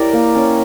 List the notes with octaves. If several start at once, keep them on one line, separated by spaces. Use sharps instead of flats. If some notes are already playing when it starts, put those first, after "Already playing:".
Already playing: E4 G4 A#4 D5
A#3
C#4